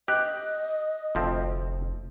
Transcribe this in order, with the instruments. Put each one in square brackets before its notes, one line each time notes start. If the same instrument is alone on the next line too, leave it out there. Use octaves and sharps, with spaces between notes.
[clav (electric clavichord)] G4 [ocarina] D#5 [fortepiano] F#6
[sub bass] F1 [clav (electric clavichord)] D2 F3 C4